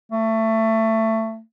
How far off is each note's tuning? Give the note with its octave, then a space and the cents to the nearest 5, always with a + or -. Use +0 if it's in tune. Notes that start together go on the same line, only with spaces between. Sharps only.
A3 +20